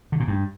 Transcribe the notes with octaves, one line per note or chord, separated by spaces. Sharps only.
D3
A#2
G2